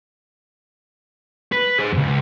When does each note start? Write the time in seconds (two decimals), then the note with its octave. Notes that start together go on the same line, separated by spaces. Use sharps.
1.52 B4
1.78 G#4 C5
1.93 C#2 F#2